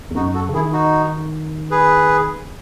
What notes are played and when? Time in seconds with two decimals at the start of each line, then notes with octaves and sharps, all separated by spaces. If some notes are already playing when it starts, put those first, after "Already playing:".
0.11 E2
0.15 F#2 D#4 F#4
0.34 F#4 A4
0.49 C#3
0.54 D#3 E4 G#4
0.73 D#4 F#4
1.71 G#4 B4